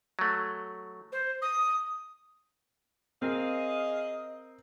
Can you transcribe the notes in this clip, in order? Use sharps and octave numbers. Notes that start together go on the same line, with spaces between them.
F#3 A3
C5
D#6
C4 G#4 A#4 D#5 F5